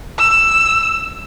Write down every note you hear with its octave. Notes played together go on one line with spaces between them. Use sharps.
E6